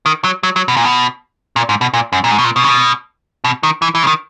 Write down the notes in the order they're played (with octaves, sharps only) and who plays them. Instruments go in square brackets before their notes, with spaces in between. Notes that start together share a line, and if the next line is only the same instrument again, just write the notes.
[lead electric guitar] D#3
F#3
F#3
F#3
B2
A#2
B2
A#2
G#2
B2
A#2
F#2
A#2
G#2
B2
A#2
B2
C#3
B2
B2
D#3
E3
E3
C#3
D#3